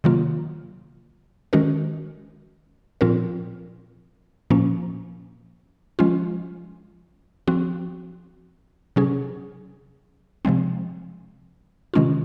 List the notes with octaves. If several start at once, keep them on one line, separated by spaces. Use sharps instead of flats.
C3 D#3 F#3 A#3 F4
D#3 G#3 C#4 F#4 A#4
A#2 F3 C4 F4 A#4
A#2 F3 A#3 C#4
F3 G#3 C#4 F4
F3 C4 F#4
C3 F#3 C#4 G#4
C3 F3 G#3 C4
C3 D#3 G#3 C#4 F4